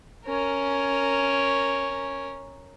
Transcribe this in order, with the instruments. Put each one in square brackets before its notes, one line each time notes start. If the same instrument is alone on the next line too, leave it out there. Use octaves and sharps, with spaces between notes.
[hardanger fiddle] C#4 A#4